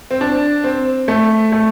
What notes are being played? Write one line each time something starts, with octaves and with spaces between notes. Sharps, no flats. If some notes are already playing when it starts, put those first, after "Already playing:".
C4
D4
C4
A3
A3